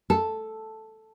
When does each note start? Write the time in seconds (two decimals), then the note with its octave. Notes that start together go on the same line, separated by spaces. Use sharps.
0.10 A4